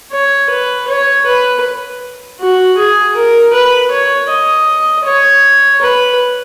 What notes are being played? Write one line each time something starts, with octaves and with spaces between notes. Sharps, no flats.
C#5
B4
C#5
B4
F#4
G#4
A#4
B4
C#5
D#5
C#5
B4